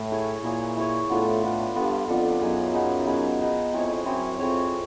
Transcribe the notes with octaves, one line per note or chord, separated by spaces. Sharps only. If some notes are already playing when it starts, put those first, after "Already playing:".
Already playing: A2
E4 G#4 C#5
A#2 E4 G#4 C#5
E4 G#4 C#5
A2 B3 D4 F4 A4
B3 D4 F4 A4
G2 B3 D4 F4 A4
F2 B3 D4 F4 A4
F#2 B3 D#4 G#4 B4
B3 D#4 G#4 B4
B3 D#4 G#4 B4
B3 D#4 G#4 B4
F2 C4 E4 G#4 C#5
F#2 C4 E4 G#4 C#5
F2 C4 E4 G#4 C#5